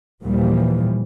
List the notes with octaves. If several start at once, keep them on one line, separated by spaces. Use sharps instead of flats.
D#2 A#2 E3 F3 G3